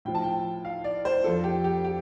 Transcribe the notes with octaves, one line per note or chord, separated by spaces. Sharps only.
A2 F3 G5
A5
G5
F5
D5
C5
F2 F3 A4
G4
G4
G4